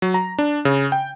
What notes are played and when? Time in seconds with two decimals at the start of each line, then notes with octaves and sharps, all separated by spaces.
0.02 F#3
0.14 A#5
0.39 D4
0.65 C#3
0.92 G5